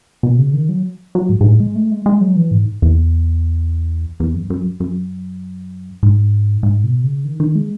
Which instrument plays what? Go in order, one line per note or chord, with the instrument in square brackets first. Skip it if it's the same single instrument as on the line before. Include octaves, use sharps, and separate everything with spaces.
[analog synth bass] B2
C#3
D#3
F#3
F#3
G#2
G#2
A2
G#3
A3
G#3
G#3
F#3
E3
G#2
E2
E2
F#2
F#2
F#2
G#2
G#2
B2
C#3
D#3
D#3
G#3